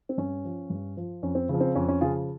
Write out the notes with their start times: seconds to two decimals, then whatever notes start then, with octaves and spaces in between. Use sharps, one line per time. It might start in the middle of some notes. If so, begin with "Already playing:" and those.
0.09 C4
0.17 G2 C#4
0.45 F3
0.70 G2
0.97 F3
1.23 F2 C#4
1.35 C4
1.49 C#3 F3
1.60 C4
1.75 F2 C#4
1.88 C#4
2.01 C#3 F3 F4 G#4